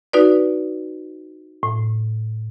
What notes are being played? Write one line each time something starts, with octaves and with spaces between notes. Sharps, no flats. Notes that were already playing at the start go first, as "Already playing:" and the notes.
D#4 F#4 B4 D5
A2